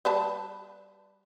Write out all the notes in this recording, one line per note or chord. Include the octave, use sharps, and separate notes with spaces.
G3 B4 A5